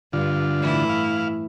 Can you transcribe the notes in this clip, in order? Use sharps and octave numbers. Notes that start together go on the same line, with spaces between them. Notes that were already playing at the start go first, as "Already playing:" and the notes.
G2 D3 F4
A2 E3 E4
F5